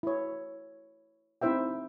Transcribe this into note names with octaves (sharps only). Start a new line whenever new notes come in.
E4 C#5
C4 D#4 E4 C5 E5 G5